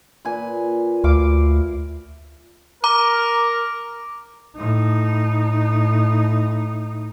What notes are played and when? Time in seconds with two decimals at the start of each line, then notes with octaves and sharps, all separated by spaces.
0.25 A#2 B4 G#5
1.04 D2 E4 F5 D6
2.84 A#4 A#5 D6
4.57 A2 D#4